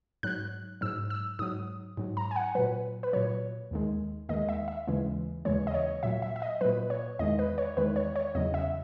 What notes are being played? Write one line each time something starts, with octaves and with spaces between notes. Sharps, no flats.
G#2 F#3 F#6
G#2 F#3 E6
E6
G#2 F#3 D#6
G#2 F#3
A#5
G#5
F#5
A#2 F#3 B4
B4
A#2 F#3 C#5
D#2 D#3 G#3
D#2 D#3 G#3 D#5
E5
E5
D#2 C#3 E3 G#3
D#2 C#3 E3 G#3 C#5
D#5
C#5
A#2 F#3 E5
E5
E5
D#5
A#2 F#3 B4
C#5
E2 D#3 G#3 D#5
B4
C#5
E2 D#3 G#3 B4
C#5
C#5
E2 C#3 F#3 D#5
E5